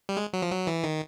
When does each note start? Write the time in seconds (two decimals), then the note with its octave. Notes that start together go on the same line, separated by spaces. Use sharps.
0.09 G3
0.17 G#3
0.33 F#3
0.42 F3
0.51 F#3
0.67 E3
0.84 D#3